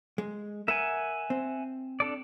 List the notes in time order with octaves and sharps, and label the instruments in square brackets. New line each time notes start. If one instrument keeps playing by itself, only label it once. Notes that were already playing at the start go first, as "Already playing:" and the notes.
[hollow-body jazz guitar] G#3
[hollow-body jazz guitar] A#4 [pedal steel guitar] E5 F#5 G#5
[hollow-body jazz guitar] C4
[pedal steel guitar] D4 A4 D5